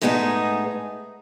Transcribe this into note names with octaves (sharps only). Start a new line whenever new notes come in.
A2 G#3 B3 D#4 G#4